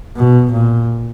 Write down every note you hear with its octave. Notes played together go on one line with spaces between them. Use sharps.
B2
A#2